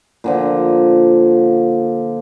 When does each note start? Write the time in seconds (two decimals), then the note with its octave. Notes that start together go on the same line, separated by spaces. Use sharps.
0.24 A#2 D3 F3